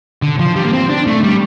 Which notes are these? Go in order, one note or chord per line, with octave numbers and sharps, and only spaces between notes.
D3
F3
G3
A#3
C4
D4
A3
G3